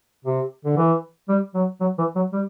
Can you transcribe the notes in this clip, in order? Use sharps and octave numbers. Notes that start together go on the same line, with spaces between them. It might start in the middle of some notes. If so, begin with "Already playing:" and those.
C3
D3
E3
G3
F#3
F#3
E3
F#3
G3